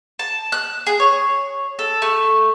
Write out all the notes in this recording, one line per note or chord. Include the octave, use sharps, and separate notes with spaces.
A5
F#6
G#4
C#5
A4
A3